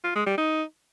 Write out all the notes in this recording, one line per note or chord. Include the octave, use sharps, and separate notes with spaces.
F4
G#3
G3
D#4